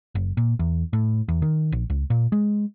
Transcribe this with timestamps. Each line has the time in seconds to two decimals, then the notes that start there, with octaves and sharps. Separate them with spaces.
0.15 F#1
0.37 A#2
0.59 E2
0.93 A2
1.28 E2
1.42 D#3
1.72 A#1
1.90 C#2
2.10 A#2
2.32 G#3